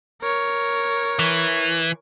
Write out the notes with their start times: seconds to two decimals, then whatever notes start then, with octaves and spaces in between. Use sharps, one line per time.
0.22 A#4 C#5
1.19 E3